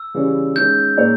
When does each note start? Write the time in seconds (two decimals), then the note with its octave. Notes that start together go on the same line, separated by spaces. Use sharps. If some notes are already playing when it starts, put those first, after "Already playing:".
Already playing: E6
0.15 C#3 E3 G3 C#4
0.55 D#3 G#3 C#4 G6
0.97 A#2 A#3 D#4 G#4 C#5